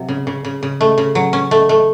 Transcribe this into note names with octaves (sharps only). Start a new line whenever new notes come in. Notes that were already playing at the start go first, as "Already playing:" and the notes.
Already playing: C3 F#3
C#3
C#3
C#3
C#3
A3
C#3
F#3
C#4
A3
A3